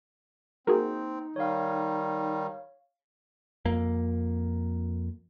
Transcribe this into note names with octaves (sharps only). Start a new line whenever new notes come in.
A#3 C4 D#4 F#4 G#4
D#3 G3 C#5 F5
F2 A#3